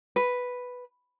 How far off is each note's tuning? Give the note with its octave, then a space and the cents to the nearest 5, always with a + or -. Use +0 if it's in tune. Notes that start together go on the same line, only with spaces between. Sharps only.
B4 +0